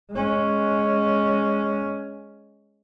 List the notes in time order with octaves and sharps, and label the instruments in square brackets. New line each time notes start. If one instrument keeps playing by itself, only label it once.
[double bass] G#3 C#4